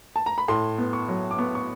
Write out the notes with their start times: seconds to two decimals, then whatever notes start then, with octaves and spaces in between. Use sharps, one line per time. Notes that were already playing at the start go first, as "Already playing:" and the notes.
0.16 A5
0.26 A#5
0.38 B5
0.48 A2 C6
0.78 B3
0.93 C#6
1.08 F#3
1.31 D6
1.38 B3 C#6
1.55 C#6